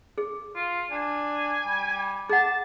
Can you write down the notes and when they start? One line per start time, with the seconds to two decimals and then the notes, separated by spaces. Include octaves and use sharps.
0.18 G#4
0.55 F4
0.91 D4 G#5
1.67 G3
2.29 G#4 F#5 A5